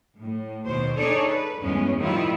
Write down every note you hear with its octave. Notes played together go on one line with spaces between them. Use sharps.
A2
D#2 B2 C5
D4 D#4 G#4 A4 C#5 D5
B4
E2 G2 G#3 B3 C#4
A2 D#3 F3 G3 E4 F4